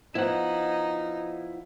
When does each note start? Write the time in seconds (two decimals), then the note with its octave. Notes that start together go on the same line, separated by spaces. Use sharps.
0.15 F3 B3 D#4 E4 F#5